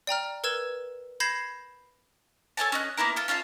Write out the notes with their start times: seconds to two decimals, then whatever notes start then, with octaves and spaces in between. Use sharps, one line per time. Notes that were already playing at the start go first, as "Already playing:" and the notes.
0.07 D5 G5 A#5 F6
0.44 A#4 B4 E6 G#6 E7
1.20 B5 G6 G#6 A#6 C7 E7
2.57 A4 C#5 G#5 A5
2.72 C#4 D#5 F#6
2.97 A#3 B3 E4 A#4
3.16 F4 A4
3.28 C#4 F4 A4 F5